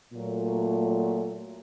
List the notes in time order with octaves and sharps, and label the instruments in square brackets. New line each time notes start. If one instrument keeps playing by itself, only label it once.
[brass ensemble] A#2 F#3 A3